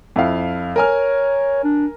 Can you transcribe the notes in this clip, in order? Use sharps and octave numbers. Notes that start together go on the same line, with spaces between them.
F2 E4 F5
A#4 C#5 G#5 F6
D4